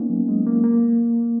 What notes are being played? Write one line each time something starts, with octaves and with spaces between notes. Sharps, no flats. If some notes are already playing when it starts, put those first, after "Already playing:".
Already playing: A#3 B3 C#4 D#4
F#3
G#3
A#3
A#3